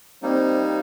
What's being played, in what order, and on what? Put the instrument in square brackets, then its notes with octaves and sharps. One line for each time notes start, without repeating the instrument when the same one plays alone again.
[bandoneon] G3 A#3 D#4 [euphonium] C4